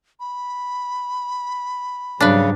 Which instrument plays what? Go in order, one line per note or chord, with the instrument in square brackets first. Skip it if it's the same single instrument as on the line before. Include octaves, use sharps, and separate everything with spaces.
[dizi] B5
[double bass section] G#2 F#3 G3 [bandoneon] C#3 [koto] D4 B4